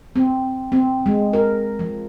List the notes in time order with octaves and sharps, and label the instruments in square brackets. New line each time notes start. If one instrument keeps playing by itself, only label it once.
[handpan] C4
C4
G#3
A#4
F3